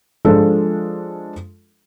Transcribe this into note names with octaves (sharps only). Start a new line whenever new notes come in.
F3 G#3 D4 F4 A4